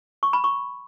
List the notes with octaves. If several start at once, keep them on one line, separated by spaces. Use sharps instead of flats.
C#6
B5
C#6